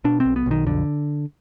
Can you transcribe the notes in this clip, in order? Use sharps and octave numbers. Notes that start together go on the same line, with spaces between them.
B2 D4
C4
B1
B3
B1 D#3
F2 D3